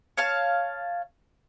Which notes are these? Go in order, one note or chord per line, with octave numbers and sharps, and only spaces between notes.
C#5 F5 A5